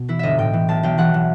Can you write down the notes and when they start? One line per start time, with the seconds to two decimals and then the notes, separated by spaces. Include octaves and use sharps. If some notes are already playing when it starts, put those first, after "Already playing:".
Already playing: B2
0.08 E3 E4
0.19 G1 D#5 E5
0.38 A2 G5
0.53 E3
0.68 B1 A5
0.83 B1 G5
0.98 E3 F#5
1.14 E3